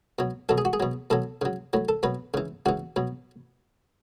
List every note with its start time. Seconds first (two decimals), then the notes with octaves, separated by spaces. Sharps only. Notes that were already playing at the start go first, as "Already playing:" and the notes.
0.19 B2 F#3
0.49 B2 F#3 A4
0.58 G#4
0.65 F#4
0.73 G#4
0.80 B2 F#3
1.10 B2 F#3 A4
1.42 C#3 F#3
1.73 A2 F#3
1.89 A4
2.03 B2 F#3 B4
2.34 C#3 E3
2.66 C#3 E3 F#4
2.96 B2 F#3